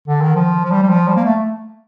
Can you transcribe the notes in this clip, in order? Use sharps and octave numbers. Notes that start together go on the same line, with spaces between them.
D3
D#3
F3
F3
G3
G3
F3
G3
A#3
A3